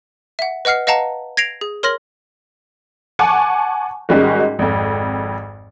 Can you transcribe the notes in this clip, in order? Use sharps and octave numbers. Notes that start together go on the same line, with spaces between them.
E5 F#5
B4 D#5 F#5 F6 C7
B4 D#5 F5 F#5 A5 A#5
G#6 A#6 C7 D7 F7
G#4
A#4 C#5 C6 F6 A#6 F#7
F#5 G#5 A5 C#6 D6
G#2 D#3 G3 G#3 C#4 F#4
G#1 F2